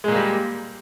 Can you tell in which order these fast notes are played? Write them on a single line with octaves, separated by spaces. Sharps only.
G#3 A#2 A#3 G3